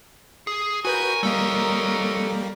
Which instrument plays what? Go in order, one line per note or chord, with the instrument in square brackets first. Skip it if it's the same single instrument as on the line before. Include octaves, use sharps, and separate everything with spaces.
[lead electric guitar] G#4
[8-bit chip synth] F#4 B4 G6 [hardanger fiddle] A#4 C#5 [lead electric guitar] G#5
[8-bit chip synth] G3 A#3 [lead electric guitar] A4 D#5